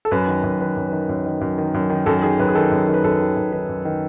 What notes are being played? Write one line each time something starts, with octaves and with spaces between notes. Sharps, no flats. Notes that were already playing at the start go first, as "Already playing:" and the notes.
A4
F#2 B4
D#3
F#2
D#3 B4
F#2
D#3 B4
F#2
D#3
F#2
D#3
F#2
D#3
F#2 A4
D#3 G#4
F#2 B4
G#4
D#3 A4
F#2
D#3
B4
F#2 A4
D#3
F#2
D#3 B4
F#2
D#3